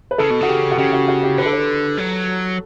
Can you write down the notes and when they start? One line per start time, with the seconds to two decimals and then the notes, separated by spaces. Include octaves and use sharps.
0.11 B4
0.18 C#3 A4
0.30 B2
0.41 C#3 F#4
0.48 G4
0.71 B2 F#4
0.78 C#3 G4
0.93 F#4
1.08 F#4
1.23 G4
1.38 D3 B4
1.46 A4
1.53 B4
1.98 F#3